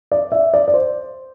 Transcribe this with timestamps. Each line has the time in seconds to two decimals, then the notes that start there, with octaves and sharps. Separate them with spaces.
0.12 D5
0.32 E5
0.54 D5
0.68 D5
0.74 C5